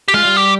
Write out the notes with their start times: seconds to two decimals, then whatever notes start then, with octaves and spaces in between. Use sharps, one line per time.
0.08 G4
0.14 G#3 F4
0.25 G3
0.37 G4